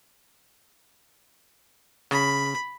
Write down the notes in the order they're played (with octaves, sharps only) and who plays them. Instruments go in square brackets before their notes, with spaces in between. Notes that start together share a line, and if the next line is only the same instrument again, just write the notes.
[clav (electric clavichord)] C#3 [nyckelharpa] B5